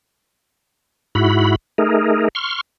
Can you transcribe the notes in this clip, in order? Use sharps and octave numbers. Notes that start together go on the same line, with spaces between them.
G#2 E4 F#4 B5
A3 D#4 G#4 A#4
C6 C#6 F6